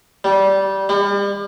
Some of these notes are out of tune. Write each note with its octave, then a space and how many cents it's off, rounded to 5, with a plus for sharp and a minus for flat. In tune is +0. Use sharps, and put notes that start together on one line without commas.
G3 -15
G3 +40